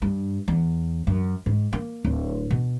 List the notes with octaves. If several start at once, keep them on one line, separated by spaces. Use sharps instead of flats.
G2
E2
F#2
G#2
A#3
D1
B2